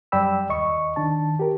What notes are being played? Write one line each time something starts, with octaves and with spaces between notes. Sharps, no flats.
F#2 G3 D5 G5 B5 E6
D#2 D#5 C#6
D#3 D4 A5
G4 A#4